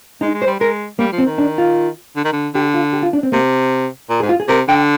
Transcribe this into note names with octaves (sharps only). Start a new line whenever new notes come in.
G#3 D#4
G#3
C5
G3
G#3 A#4
G3 A#3
F3
C4
D#3
D4
F4
D3
D#3
D3
D3 G4
F4
G4
F4
D4
C4
C3 A#3
A#2
G#2 G#4
F4
G#4
C3 A#4
D3 G5